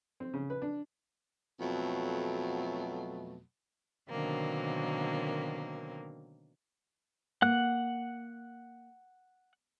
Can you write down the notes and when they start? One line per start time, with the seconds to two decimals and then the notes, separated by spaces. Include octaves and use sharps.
0.20 C4
0.34 C#3
0.50 B4
0.62 D4
1.60 F2 B2 F#3 A3
4.10 B2 D3 D#3 F#3 A#3 C4
7.42 A#3 F#5 F#6